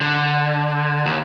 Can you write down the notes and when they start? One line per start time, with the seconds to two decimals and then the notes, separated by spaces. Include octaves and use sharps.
0.01 D3
1.06 D#2